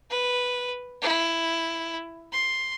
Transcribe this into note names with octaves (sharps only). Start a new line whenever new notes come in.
B4
E4
C6